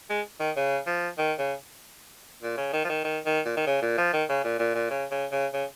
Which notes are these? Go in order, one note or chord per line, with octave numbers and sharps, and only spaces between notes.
G#3
D#3
C#3
F3
D#3
C#3
A#2
C#3
D#3
F3
D#3
D#3
D#3
A#2
D#3
C#3
A#2
F3
D#3
C#3
A#2
A#2
A#2
C#3
C#3
C#3
C#3